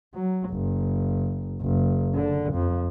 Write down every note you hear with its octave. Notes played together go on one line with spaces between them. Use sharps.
F#3
F#1
F#1
D3
F2